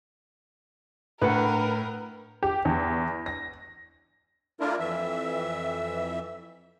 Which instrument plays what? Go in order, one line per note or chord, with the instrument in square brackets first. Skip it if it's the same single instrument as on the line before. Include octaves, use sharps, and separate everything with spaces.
[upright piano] A2 [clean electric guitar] D4 F#5 [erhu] A#4 [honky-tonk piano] B4
[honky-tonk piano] G4
E2
A#6
[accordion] A3 D4 E4 F4 A#4
F2 E3 E5